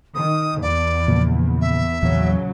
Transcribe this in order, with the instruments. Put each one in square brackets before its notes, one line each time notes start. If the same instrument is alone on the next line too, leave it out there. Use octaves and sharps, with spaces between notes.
[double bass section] D#3 [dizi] D#6
[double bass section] E2 [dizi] D5
[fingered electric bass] A#2 C#3 F3
[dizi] E5
[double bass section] A#1 C#3 F#3 [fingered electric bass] E2 A#2 E3